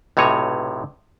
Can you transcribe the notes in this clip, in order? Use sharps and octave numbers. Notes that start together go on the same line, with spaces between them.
B1 A2 C3 C#5 G#5 A#5